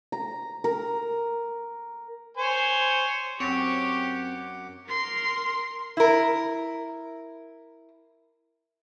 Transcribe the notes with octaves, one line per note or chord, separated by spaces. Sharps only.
A#5
A#4
C5 C#5 G#5
F#2 C4 G4 C#5 F#5 D6
A#4 C6
E4 A#4